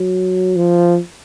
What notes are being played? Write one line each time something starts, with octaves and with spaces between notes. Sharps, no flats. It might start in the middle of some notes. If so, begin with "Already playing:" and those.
Already playing: F#3
F3